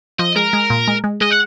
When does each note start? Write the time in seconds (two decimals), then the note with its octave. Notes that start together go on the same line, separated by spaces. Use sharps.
0.19 F3 D#5
0.36 G#3 A#4
0.53 G#3
0.70 A#2
0.88 G#3
1.04 G#3
1.21 G#3 D#5
1.30 F#5